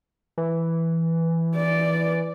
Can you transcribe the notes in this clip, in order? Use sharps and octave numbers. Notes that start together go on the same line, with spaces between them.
E3
D5